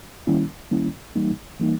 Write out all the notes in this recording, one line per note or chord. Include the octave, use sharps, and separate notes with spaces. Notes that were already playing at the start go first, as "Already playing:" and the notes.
D#3 G3 A#3 C#4 E4
D#3 G3 A#3 C#4 E4
E3 G3 A#3 D#4
E3 G3 A#3 D#4